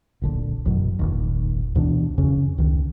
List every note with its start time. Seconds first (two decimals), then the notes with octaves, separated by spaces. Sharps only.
0.22 D1 A#1 D3
0.65 A1 F#2 B2 F#3
0.99 F1 A#1 D#2
1.75 D2 B2 E3 D4
2.18 F2 C#3 C#4
2.58 C#2 D#3